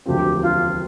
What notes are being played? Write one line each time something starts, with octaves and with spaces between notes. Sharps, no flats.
E1 D2 C3 F3 C4 G4
F4